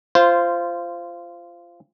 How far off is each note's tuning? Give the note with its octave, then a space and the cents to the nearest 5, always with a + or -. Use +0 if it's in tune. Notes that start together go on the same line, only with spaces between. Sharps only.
F4 -15 C5 +0